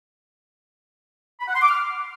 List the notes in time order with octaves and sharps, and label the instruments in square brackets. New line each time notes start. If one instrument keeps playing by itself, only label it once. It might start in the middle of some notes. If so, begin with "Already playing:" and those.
[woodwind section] B5
F#5
C6
D6
F6